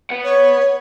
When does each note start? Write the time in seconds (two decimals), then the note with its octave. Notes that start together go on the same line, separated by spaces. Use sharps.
0.10 B4 F#5
0.24 C#5